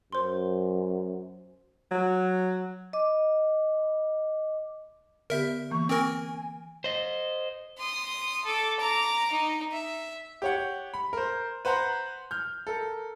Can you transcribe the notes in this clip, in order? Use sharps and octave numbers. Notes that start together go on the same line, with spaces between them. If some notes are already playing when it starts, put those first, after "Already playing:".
F#2 C5 C6
F#3
D#5 D6
D3 B3 G4 A#4 E5
E3 A#3 C#6
C4 A#4 G#5 D6 A#6
C5 D#5
C6 D#6
A4 D6
A#5 D6
D#4
E5
G4 C#5 F#5
B5
A#4 C5
B4 C5 F#5 A#5 F#6
F6 G6
A4 A#4